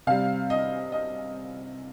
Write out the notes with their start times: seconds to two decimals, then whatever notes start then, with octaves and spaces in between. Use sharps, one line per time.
0.07 C3 G3 F5
0.50 D#5
0.92 D#5